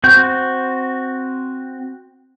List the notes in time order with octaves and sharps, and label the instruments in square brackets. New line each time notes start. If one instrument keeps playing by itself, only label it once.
[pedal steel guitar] C4 F#4 G6